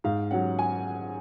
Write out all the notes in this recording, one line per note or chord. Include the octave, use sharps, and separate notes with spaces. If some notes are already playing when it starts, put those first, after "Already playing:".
G#2 F5
F#3 C#4 F#5
G#5